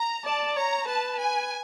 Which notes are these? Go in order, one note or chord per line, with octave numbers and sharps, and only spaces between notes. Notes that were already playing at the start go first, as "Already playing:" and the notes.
Already playing: A#5
D5 A5
C#5 A#5
B4 A5
G#5